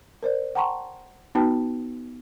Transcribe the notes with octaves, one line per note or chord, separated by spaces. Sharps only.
A#4 C5 D5
F#5 G5 A5 A#5 C6 C#6
B3 D#4 F#4 B4 G5 A5